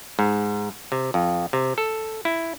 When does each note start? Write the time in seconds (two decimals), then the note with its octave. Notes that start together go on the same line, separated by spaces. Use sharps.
0.19 G#2
0.92 C3
1.14 F2
1.53 C3
1.78 A4
2.25 E4